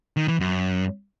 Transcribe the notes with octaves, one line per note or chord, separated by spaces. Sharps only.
D#3
E3
F#2